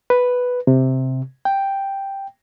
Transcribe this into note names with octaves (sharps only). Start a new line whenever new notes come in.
B4
C3
G5